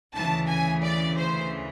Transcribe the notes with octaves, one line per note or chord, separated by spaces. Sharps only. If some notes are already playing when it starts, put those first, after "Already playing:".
D2 C#3 E3 A5
G#5
D5
C5